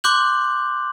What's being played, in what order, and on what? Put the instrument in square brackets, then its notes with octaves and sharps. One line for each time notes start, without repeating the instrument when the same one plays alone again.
[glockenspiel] C6 D6 F#6 G6 F#7